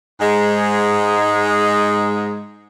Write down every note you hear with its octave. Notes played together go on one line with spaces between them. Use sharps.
G#2 G#3